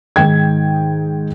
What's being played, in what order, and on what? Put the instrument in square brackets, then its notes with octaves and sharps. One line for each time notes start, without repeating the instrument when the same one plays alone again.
[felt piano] G#2 D#3 G5 G#6